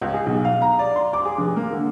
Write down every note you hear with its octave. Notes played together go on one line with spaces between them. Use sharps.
C#2
G#4
B1
F5
A#5
D5
C6
D6
G#4
F1
A#3
D3